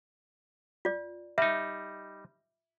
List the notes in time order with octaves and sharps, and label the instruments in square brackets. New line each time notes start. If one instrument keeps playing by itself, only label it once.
[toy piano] F4 D5
[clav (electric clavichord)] G3 D#4 [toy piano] E5